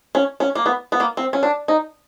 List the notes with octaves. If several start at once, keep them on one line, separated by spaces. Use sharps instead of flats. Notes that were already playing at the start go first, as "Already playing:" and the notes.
C#4
C#4
A#3
B3
B3
A#3
C4
C#4
D4
D#4